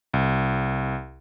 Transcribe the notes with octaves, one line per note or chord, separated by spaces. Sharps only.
C2